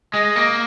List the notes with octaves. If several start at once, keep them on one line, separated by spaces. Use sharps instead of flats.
G#3 D#5
A#3